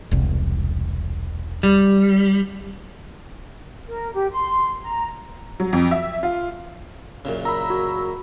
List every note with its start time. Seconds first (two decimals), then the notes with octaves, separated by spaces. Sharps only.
0.11 E1 C2
1.63 G3
3.88 A#4
4.14 G4
4.32 C6
4.83 A#5
5.60 F#3
5.73 F2
5.91 E5
6.23 F4
7.25 F#2 A#2 C#3
7.45 A#5 B5 E6
7.70 F#4